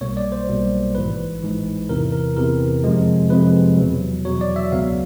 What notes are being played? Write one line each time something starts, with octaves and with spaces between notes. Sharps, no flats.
B1 B2 G3 A#3 C#5
D5
C5
B1 B2 G3 A#3
A1 G#2 E3 B4
A1 G#2 E3
E2 C3 E3 A#4
A#4
E2 C3 E3 A#4
F2 C3 F3 G#3
F2 C3 F3 G#3 B4
E2 B2 F#3
E2 B2 F#3 C#5
D5
E5
C#2 C#3 F#3 B3 F5